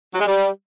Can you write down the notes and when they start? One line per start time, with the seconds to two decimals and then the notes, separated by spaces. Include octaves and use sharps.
0.14 F#3
0.21 G#3
0.27 G3